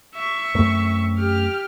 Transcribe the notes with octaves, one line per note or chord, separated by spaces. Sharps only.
E5 C#6
F#2 A3 C4
G4 F6